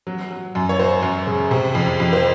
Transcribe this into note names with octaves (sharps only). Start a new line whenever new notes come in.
F#3
F#3
F#2
C#5
F#3 C5
F#2
C#3
C3
F2
F2
C5